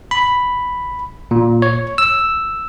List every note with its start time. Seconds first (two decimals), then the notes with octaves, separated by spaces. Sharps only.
0.11 B5
1.31 A#2
1.62 C#5
1.98 E6